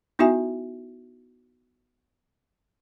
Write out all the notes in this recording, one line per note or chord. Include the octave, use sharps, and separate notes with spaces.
B3 D#4 E4 F#4 E5 G#5